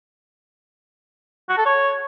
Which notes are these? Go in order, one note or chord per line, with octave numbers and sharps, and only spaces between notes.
F#4
A4
C#5